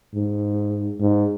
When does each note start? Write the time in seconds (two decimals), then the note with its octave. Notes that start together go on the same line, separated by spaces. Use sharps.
0.15 G#2
1.00 G#2